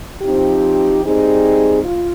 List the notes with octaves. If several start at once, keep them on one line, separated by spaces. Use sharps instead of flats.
F3 C4 D#4 G4
G3 C4 D#4 G#4
F4